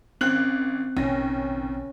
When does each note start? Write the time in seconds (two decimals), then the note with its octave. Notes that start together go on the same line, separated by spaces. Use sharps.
0.21 G#1 C4 C#4 F#6 F#7
0.97 A#1 D#2 B2 C#4 A#6